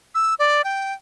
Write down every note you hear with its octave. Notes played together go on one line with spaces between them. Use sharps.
E6
D5
G5